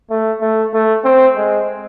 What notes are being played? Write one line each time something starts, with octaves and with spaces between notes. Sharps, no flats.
A3
A3
A3
C4
G#3